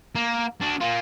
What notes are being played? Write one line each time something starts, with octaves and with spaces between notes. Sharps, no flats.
A#3
D4 F#4
A#3 F4